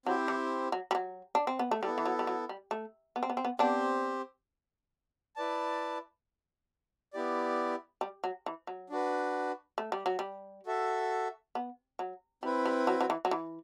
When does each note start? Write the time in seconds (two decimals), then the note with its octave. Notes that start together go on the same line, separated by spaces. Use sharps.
0.06 F#3 C4 E4 G4 C5
0.28 E3
0.72 F#3
0.91 G3
0.95 F#3
1.35 D4
1.47 C4
1.59 B3
1.71 A3
1.83 G3 B3 E4 A4
1.98 E3
2.06 F#3
2.19 G3
2.27 F#3
2.49 G3
2.71 A3
3.16 B3
3.23 C4
3.30 B3
3.37 C4
3.45 B3
3.59 B3 C4 D4 G4 C5
5.36 E4 B4 D5 A5
7.13 B3 E4 G4 D5
8.01 G3
8.24 F#3
8.46 E3
8.67 F#3
8.90 D4 F#4 B4
9.78 A3
9.92 G3
10.06 F#3
10.19 G3
10.66 F#4 A4 E5
11.55 B3
11.99 F#3
12.43 G3 C4 E4 B4
12.65 G3
12.87 F#3
13.01 F#3
13.10 E3
13.25 F#3
13.31 E3